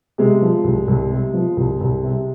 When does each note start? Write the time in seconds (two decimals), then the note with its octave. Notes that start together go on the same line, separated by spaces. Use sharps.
0.18 C3 G#3
0.41 F3
0.64 C2
0.88 C2
1.11 C3
1.34 F3
1.57 C2
1.81 C2
2.04 C3